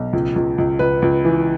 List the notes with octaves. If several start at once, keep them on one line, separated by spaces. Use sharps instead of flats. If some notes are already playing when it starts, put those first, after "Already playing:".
Already playing: B1
C#2
C#2
C#2
C#2 B4
C#2
E3